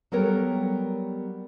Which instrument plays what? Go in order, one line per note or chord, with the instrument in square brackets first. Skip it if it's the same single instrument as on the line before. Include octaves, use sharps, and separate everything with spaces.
[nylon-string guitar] F#3 G3 B3 A4 A#4 C#5